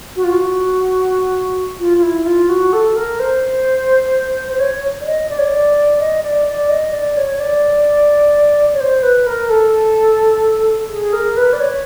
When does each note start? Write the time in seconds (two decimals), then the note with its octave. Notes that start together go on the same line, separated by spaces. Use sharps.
0.16 F#4
0.24 F4
0.32 F#4
1.79 F4
1.97 F4
2.03 E4
2.21 E4
2.26 F4
2.49 F#4
2.73 A4
2.96 A#4
3.20 C5
4.51 C5
4.59 C#5
5.01 D5
5.06 D#5
5.29 D5
5.38 C#5
5.46 D5
6.00 D#5
6.23 D5
6.47 D5
6.69 D#5
6.93 D5
7.16 C#5
7.34 C#5
7.40 D5
8.74 C#5
8.80 C5
9.03 B4
9.26 A#4
9.49 A4
10.90 G#4
11.13 A#4
11.37 B4
11.53 D5
11.60 C#5